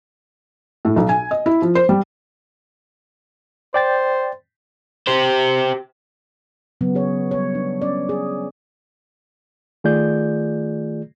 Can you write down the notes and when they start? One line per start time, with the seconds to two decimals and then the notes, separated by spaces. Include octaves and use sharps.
0.85 A2
0.96 B1
1.09 G#5
1.31 D#5
1.46 E4
1.62 F3
1.75 C5
1.89 G3
3.74 C5 D5 G5 A6
5.07 G4 C5
6.81 C#3 F#3 B3
6.95 G#4 C#5
7.31 G3 C#5
7.55 D4
7.82 C#4 D5
8.09 G#4
9.84 D#3 A3 F4 G#4 D5 G6